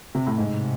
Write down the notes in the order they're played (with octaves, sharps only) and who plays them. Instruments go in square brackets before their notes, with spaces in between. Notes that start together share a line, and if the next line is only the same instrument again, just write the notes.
[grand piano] C3
A2
[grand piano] G#2 [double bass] C3